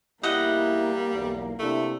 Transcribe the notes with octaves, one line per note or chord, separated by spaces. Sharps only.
E2 G3 A#3 E4 D#5 F#5
B1 E2
C3 A3 D4 E4